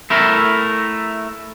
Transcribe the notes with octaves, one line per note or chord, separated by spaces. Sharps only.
A3 E4 A#4